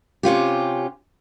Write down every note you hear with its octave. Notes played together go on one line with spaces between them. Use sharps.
C3 C#4 F4 G4